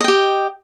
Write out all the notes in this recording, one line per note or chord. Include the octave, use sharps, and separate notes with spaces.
G4 D#5 G5